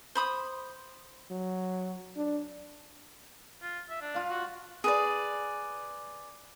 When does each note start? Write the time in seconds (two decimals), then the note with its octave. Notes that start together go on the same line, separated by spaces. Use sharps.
0.15 C5 B5 D#6
1.30 F#3
2.16 D4
3.62 F4
3.90 E5
4.01 D4
4.14 F4 F5
4.30 F#4
4.84 G#4 B4 D5